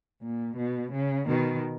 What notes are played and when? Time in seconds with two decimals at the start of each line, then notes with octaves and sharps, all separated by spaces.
0.22 A#2
0.57 B2
0.92 C#3
1.27 B2 D#3